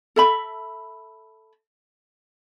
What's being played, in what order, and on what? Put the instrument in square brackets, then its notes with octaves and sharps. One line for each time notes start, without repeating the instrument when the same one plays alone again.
[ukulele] A4 E5 B5